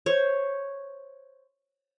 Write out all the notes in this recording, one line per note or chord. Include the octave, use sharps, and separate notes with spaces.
C5 C#5